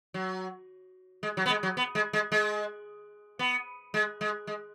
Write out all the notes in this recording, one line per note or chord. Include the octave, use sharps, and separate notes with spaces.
F#3
G#3
F#3
B3
G#3
F#3
B3
G#3
G#3
G#3
B3
G#3
G#3
G#3